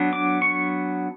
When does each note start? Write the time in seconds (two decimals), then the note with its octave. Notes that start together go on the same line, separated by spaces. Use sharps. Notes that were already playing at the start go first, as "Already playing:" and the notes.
Already playing: F#3 B3 D4
0.13 D6
0.42 C#6